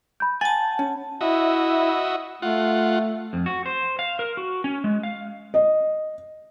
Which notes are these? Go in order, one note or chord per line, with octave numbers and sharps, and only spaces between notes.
B5 G6
F#5 G#5 A5 A6
C#4
E4 F#4 D#5 E5
A3 F4 F#5
F2
F#4
C5
F5
A#4
F#4
C#4
G#3
F5
D#5